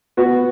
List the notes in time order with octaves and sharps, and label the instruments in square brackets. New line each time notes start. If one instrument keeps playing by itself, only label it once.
[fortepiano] B3 F#4